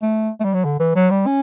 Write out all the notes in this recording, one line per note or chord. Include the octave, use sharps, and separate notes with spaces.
A3
A3
G3
F#3
D3
E3
F#3
G3
C#4